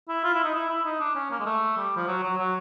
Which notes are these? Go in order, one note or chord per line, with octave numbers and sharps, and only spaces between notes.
E4
F4
E4
D#4
E4
E4
D#4
D4
C#4
A#3
G#3
A3
G3
F3
F#3
F#3
F#3